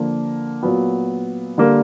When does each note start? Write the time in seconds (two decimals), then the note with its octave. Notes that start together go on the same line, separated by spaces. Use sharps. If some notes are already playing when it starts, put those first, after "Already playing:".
Already playing: D3 F3 A#3
0.63 A#2 F#3 B3
1.58 D3 G3 A#3